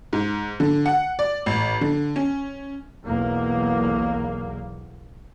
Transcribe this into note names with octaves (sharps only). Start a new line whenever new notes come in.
G#2
D3
F#5
D5
A1
D3
C#4
B1 E2 A#3